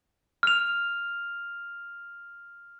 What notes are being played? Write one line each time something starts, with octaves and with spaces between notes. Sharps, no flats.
F6 F7